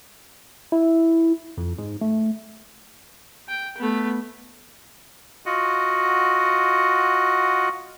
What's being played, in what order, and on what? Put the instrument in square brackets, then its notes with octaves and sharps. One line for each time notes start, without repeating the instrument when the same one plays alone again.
[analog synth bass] E4
F2
G#2
A3
[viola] G5
A3 B3
[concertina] F4 F#4 D#5 F#5